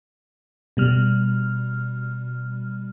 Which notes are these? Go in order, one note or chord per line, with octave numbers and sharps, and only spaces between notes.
B2 G3 F6